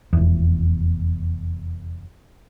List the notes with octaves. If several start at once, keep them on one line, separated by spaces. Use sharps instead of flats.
F1 E2